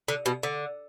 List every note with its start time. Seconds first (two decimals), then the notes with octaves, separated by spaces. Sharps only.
0.08 D3
0.26 B2
0.43 D3